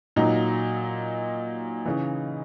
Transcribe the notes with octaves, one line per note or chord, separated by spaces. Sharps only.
A#2 F#3 D#4
C#3 E3